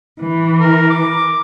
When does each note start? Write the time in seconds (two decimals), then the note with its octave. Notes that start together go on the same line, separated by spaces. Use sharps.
0.22 E3
0.60 A#4
0.90 D6